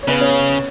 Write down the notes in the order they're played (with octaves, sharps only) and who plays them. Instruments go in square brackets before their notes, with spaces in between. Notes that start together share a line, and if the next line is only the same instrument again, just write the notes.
[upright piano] C#5
[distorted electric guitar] C#3 [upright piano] B3 B4
[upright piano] C#4 C#5